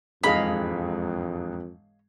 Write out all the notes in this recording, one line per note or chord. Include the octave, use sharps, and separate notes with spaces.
E1 F2 G#2 G#4 C#5 D#5 F5 B5